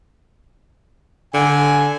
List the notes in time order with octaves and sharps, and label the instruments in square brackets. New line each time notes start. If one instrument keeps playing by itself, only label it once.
[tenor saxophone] D3 [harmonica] G#5